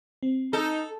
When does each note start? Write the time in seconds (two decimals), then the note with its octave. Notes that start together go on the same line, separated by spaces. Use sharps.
0.23 C4
0.53 D#4 A4